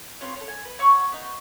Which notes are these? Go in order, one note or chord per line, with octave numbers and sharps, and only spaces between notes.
B3 C4 F4 C#5
A4 C#5
G#5
B4
C#5 F#5 C#6 E6
B3 D#4